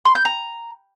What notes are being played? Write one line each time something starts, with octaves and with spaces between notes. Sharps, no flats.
C6
G6
A#5